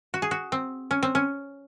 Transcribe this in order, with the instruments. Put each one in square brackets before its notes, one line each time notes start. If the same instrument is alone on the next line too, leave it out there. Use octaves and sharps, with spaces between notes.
[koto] F#4
G#4
F#4
C4
C#4
C4
C#4